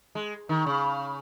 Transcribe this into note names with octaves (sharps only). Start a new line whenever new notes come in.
G#3
D#3
C#3